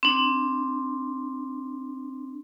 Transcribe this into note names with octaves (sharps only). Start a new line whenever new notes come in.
C4 D4